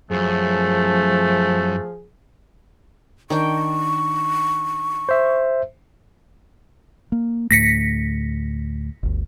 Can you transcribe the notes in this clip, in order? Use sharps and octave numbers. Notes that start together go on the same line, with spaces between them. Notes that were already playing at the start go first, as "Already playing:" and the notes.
F#2 F3 A3 G#4
D#3 D4 G5 C#6
C5 E5
A#3
D2 A2 A3 A#6 B6 C#7
G1 D2